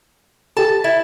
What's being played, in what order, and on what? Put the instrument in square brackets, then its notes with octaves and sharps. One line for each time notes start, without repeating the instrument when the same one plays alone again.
[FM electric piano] G4 A4 [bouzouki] A5
[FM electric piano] A6
[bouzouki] E4